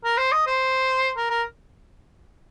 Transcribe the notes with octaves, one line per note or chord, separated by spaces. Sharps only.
A#4
C5
D#5
C5
A#4
A#4